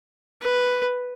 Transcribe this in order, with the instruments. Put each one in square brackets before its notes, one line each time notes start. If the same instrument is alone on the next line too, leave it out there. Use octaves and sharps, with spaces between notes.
[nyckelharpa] B4